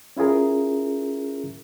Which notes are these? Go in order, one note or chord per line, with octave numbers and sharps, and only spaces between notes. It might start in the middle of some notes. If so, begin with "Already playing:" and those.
C#4 E4 F4 G#4 A#4